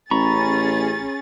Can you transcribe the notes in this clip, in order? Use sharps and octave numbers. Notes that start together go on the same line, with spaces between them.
A1 C#4 G#4 A#5 B5 C#6 A6